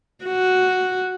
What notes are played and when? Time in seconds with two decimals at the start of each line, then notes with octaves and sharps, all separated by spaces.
0.25 F#4